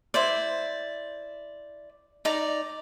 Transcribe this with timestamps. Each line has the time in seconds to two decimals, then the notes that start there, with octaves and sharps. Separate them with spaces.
0.14 E4 C5 D5
2.25 D#4 D5 A#5